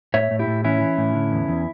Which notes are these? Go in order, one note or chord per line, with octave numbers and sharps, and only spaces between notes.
A2 C#5 E5
A2
E4 G4
A2
E3 C#4 E4
E3
A2
D3
E2
E2